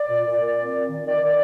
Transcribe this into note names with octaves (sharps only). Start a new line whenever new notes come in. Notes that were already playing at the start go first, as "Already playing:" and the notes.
Already playing: D5
A#2
A#2
A#2
C4
A#2
D#3
D#3 D5
D#3 D5